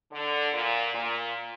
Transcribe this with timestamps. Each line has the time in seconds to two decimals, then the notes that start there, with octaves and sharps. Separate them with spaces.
0.12 D3
0.53 A#2
0.94 A#2